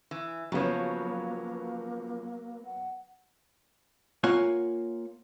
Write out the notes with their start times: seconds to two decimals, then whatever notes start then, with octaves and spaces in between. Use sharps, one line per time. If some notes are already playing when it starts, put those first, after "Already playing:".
0.11 E3
0.52 C#3 F3 F#3 A#3 B3 C#5
2.65 F#5
4.24 A#3 F4 C#5 F#5 G#5